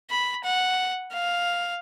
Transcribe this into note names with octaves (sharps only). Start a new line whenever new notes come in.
B5
F#5
F5